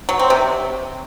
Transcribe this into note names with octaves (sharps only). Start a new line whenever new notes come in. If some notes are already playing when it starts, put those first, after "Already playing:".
F#3
C4
C3